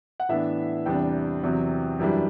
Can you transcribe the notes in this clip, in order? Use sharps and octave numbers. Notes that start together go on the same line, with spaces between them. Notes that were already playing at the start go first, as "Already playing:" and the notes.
F#5
A2 E3 B3 D4 E5
E2 C3 G3 D4 G5
E2 C3 F#3
F#2 E3 G3 D4